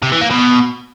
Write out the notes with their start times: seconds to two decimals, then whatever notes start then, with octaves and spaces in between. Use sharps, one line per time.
0.03 C3
0.12 E3
0.21 A#3
0.31 B2